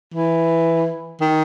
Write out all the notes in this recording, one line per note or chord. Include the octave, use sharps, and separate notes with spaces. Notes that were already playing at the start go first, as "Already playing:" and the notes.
E3
D#3